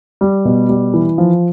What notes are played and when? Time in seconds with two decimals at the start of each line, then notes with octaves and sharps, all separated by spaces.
0.21 G3
0.45 B2
0.69 G3
0.94 E3
1.18 F3